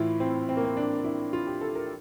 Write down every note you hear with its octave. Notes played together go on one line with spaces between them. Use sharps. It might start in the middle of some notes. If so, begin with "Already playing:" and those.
Already playing: A2 E3 E4 F4
C4
C4
A#3
C4
D4
D4
E4
F4
G4
A4
A#4